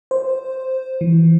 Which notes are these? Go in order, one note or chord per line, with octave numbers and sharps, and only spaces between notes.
C5
E3